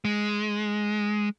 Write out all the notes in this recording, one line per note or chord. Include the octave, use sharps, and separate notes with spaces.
G#3